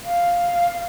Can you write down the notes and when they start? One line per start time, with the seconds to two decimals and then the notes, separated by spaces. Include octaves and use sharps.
0.04 F5